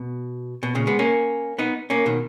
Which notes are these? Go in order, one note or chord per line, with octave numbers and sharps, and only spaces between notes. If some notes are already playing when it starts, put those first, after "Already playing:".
Already playing: B2
B2
A#2 C#3
G#3 B3
A#3 C#4
B3 D#4
A#3 C#4
B2 D#3